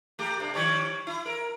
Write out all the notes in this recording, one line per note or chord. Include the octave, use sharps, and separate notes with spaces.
A3 G4
G2 C3
D#3 G3 C#5
E4
A#4